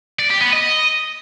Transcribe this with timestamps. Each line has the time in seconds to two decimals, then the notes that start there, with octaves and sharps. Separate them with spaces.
0.19 D5
0.30 G4
0.42 B3
0.53 D#5